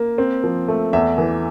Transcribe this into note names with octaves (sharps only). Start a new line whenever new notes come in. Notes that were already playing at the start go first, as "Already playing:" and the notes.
Already playing: A#3
C4
F3
A3
E2 E5
E3